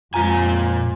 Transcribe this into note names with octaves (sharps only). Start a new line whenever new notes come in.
F2 A#2 G#3 F4 G#5 A#5